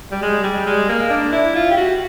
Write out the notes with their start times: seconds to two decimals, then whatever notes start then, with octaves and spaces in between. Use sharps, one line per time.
0.12 G3
0.22 G#3
0.44 G3
0.67 G#3
0.89 A#3
1.10 D4
1.32 E4
1.55 F4
1.71 G4
1.77 F#4